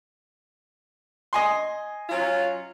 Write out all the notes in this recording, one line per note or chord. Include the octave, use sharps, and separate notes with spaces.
D#5 G#5 C6
F#3 C#4 F4